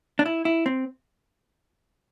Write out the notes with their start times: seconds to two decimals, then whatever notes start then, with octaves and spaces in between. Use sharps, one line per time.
0.19 D4
0.25 E4
0.45 E4
0.66 C4